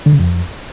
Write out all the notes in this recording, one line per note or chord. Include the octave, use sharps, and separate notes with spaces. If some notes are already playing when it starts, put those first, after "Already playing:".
D3
C#3
F2